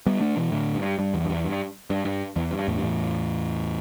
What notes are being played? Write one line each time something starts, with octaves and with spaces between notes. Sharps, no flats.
G3 B3
A3 D4
B2 E3
A2 D3
G2
G2
E2
G2
E2
G2
G2
G2
E2
G2
E2 A2
G2
E2 A2